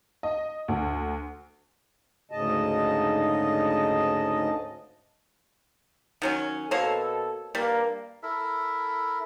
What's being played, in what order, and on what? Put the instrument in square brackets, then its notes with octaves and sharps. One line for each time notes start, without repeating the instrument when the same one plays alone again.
[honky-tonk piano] D#5
D2
[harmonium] D2 G#2 C#3 D#5 A5
[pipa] D#3 F#3 C#4
[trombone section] B2 A4 [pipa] A#3 C5 C#5
[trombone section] G2 A#3 [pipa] G3
[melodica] E4 A4 A#4 E5